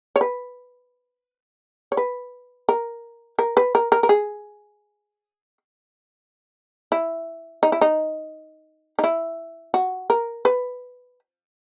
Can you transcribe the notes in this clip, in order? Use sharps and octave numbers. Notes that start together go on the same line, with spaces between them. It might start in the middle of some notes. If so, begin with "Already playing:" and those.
C#5
B4
C#5
B4
A#4
A#4
B4
A#4
A#4
A#4
G#4
E4
D#4
E4
D#4
D#4
E4
F#4
A#4
B4